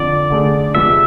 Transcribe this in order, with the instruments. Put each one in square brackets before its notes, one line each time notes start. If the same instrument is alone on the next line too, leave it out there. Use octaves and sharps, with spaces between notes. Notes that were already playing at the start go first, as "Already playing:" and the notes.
Already playing: [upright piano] F2 D3 F3 [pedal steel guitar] D5
[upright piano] D3 A3 D4 G#4
[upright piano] F2 C3 G#3 B3 [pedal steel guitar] E5